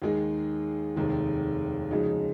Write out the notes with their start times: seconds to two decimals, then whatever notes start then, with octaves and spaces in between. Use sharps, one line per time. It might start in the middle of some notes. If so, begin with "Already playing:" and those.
0.02 D#2 D#3 G#3 D#4 G#4
0.96 F1 D#2 D#3 G#3
1.90 F2 C#3 G#3 D#4 F#4